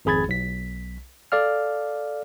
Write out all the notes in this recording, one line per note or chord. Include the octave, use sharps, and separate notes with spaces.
G#1 F2 G#4 B5 G#6 A6
B1 B6
A4 D5 F5 F6